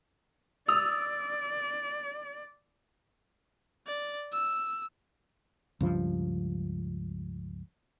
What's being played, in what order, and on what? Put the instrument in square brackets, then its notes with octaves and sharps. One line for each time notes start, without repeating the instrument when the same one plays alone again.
[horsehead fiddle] D5 [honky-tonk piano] D#6 E6 F7
[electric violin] D5
E6
[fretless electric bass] C#2 G2 F3